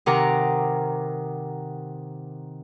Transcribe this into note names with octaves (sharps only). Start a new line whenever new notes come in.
C3 D#3 A#4 F#5 A#5 D6